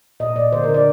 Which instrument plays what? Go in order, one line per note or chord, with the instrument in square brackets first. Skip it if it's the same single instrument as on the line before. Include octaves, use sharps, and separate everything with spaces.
[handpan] A#2 D#5
A#2 D5
D3 C5
A#4
D3
D5